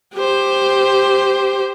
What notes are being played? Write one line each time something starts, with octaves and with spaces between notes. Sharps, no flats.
G4 C5